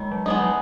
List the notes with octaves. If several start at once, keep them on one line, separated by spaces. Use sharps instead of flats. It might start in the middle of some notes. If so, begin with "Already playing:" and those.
Already playing: D#3 G#3
F#3
G#3 B3 D#4
F#3